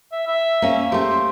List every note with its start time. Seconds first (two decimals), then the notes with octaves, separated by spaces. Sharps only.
0.12 E5
0.27 E5
0.62 A#3 C#4
0.92 A3 G4 C5